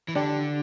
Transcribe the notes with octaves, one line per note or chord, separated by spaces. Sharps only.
E3
D3 D4 G4